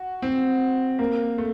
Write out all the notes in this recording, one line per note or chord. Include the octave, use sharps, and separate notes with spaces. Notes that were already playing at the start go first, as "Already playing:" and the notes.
Already playing: F#4
C4
A#3
A3